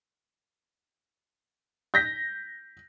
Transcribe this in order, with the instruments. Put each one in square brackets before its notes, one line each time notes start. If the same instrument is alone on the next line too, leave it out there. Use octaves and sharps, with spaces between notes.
[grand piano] G6 A#6 B6